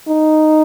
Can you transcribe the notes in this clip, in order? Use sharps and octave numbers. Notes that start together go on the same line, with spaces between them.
D#4